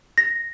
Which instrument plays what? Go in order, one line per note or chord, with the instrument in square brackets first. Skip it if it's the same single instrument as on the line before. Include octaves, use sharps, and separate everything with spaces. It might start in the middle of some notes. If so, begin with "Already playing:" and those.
[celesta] A#6